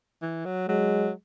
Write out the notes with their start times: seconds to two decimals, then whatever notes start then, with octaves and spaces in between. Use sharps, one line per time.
0.22 E3
0.45 F#3
0.68 F#3 G#3